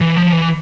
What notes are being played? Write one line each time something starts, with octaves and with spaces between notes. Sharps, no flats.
E3
F3
E3